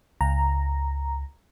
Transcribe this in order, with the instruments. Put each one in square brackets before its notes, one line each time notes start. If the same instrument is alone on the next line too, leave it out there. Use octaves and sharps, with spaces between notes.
[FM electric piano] C#2 A#5